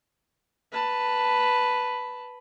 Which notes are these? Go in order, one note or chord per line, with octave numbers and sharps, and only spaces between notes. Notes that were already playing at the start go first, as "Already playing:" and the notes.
B4 A5